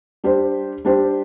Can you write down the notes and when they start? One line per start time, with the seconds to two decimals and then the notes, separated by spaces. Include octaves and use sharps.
0.24 G3 D4 G4 C5
0.85 G3 D4 G4 C5